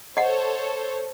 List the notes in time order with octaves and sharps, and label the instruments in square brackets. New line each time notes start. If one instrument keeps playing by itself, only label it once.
[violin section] A4 C5 C#5 [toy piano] D#5 F#5